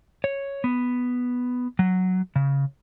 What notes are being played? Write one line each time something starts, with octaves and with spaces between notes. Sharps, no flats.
C#5
B3
F#3
C#3